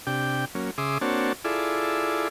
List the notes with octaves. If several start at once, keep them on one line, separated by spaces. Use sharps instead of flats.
C3 D4 G4 G5
F#3 A#3 C#4
C#3 G#4 E5 C6 D6 D#6
A#3 C4 D4 F#4 C#5 A5
E4 F4 G#4 A4 D5